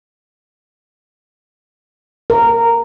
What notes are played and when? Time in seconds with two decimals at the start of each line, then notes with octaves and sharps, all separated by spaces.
2.30 A#4